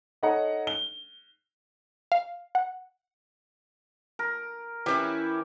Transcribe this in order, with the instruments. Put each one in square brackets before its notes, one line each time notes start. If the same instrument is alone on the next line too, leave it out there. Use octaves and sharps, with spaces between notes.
[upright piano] D#4 A4 C#5 D#5 F#5 A#5
G7
[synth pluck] F5
F#5
[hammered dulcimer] A#4
[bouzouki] E3 C#4 E4 [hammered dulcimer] G4